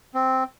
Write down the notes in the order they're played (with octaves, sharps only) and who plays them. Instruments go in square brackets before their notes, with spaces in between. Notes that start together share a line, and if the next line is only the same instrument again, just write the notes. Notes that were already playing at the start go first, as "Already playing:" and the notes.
[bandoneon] C4